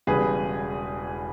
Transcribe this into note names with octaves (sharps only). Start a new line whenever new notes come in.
E1 E2 C#3 G3 G#4 B4